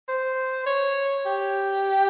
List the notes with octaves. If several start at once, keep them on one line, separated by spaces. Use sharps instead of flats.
C5
C#5
G4